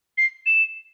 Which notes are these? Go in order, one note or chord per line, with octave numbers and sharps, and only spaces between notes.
C7
E7